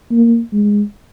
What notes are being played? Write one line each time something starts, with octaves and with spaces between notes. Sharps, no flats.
A#3
G#3